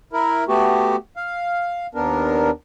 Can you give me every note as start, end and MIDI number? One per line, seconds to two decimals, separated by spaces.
0.13 0.44 64
0.13 0.44 70
0.48 0.96 57
0.48 0.96 59
0.48 0.96 66
0.48 0.96 67
1.17 1.87 77
1.95 2.50 39
1.95 2.50 59
1.95 2.50 62
1.95 2.50 70